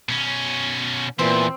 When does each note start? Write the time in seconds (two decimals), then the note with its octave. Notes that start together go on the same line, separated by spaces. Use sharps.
0.09 B2 C#4
1.19 E2 A#2 E3 C4